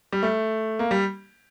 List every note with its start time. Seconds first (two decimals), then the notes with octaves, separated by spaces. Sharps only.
0.12 G3
0.23 A3
0.79 A#3
0.91 G3